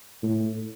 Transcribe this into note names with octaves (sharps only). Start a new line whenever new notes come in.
A2